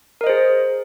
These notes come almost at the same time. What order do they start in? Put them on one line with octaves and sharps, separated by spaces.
A#4 D#5 C5 G#4